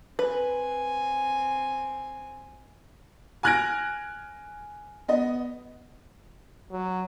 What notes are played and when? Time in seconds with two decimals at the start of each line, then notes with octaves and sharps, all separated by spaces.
0.19 C4 B4 G#5
3.43 G#5 F6 F#6 G#6 A#6 D7
5.08 B3 D#5
6.72 F#3